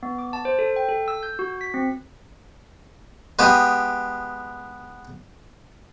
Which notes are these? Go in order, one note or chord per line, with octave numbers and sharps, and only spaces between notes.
B3
D6
A5
C5
A4
G5
A4
E6
G6
F#4
B6
C4
G#3 B3 G4 G5 D#6